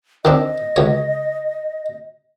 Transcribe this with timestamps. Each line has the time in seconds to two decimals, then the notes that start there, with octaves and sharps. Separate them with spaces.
0.25 D#3 C4 D4 D#5
0.76 C#2 C#5